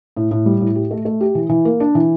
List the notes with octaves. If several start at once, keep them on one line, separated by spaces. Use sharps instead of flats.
A2
A2
G3
A2
G4
A3
A3
G4
E3
E3
A#3
D4
E3